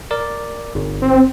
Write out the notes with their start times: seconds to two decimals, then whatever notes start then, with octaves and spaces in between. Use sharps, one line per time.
0.11 A#4 D5
0.75 G1
1.02 C4